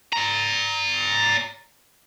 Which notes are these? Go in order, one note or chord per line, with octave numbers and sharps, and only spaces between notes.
D5 A#5